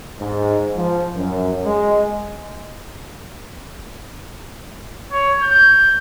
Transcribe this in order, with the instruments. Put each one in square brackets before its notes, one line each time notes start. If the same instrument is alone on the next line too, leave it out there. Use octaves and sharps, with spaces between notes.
[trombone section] G#2
F3
F#2
G#3
[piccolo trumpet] C#5
G6